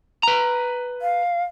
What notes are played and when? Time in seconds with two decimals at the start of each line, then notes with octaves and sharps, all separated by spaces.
0.23 B4 A#5
1.02 F5